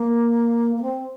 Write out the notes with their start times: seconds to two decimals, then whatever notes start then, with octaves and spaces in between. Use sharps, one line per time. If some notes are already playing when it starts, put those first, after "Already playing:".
Already playing: A#3
0.75 A#3
0.81 C4